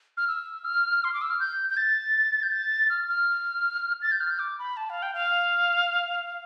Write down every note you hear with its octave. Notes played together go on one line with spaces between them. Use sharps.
F6
E6
F6
C6
D6
E6
F6
G6
G6
A6
G6
A6
F6
F6
A6
G6
F6
G6
D6
B5
A5
F5
G5
F5